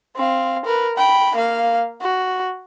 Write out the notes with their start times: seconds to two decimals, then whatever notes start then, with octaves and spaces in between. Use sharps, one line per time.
0.16 C4 F5
0.65 A#4 B4
0.97 G5 B5
1.36 A#3 F5
2.01 F#4